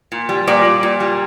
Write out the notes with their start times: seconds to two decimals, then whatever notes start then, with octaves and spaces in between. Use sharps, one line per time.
0.12 A#2
0.29 G3
0.48 A#2 D5
0.65 A#2
0.83 A#2
1.00 G3